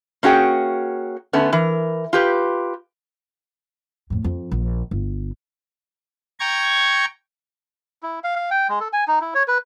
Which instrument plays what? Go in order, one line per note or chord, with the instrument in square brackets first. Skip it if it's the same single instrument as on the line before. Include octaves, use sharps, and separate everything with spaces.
[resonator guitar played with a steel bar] A#3 C#4 F#4 G#4 G5
D3 A3 B3 C#4
E3 A#4
F4 G4 B4
[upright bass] F2 A2
F2
A#1
G1
[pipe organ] G5 A#5 C#6 G#6
[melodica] E4
F5
F5
G5
G#3
A4
G#5
D#4
E4
C#5
B4